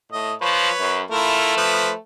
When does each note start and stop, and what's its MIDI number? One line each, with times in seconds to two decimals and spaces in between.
0.12 0.33 45
0.12 0.33 75
0.41 0.68 53
0.41 1.02 71
0.41 1.02 73
0.80 1.02 42
1.11 1.97 57
1.11 1.54 64
1.11 1.54 65
1.11 1.54 70
1.57 1.91 53
1.57 1.91 71
1.57 1.91 72